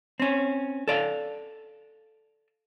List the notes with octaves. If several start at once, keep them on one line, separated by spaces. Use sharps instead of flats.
C4 C#4
A4 D5 F5